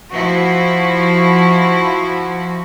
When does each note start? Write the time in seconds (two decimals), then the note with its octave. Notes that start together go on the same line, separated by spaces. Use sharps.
0.12 F3 E4 F#4